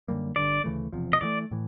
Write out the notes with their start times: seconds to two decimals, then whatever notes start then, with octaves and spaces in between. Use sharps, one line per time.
0.08 F#2 D3 G3 A#3
0.36 G1 G2 D3 D5
0.64 D2 C#3 E3 A3
0.93 E1 E2 C3 F3
1.13 D#5
1.21 G2 E3 A3 D5
1.51 A2 E3